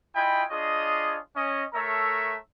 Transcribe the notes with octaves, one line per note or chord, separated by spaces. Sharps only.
E4 F4 D#5 G5 G#5 B5
D4 F4 G#4 C#5 D#5
C#4 D#5
A3 A4 A#4 C#5 E5 A#5